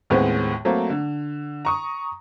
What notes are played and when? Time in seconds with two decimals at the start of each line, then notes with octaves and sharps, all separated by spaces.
0.10 D#2 A2 G#3 B3 C4
0.65 F#3 A3 A#3 C4
0.90 D3
1.65 A#5 C#6 D#6